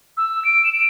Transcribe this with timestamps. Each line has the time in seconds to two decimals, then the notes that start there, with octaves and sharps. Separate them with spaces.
0.17 E6
0.45 D7
0.64 E7
0.73 D7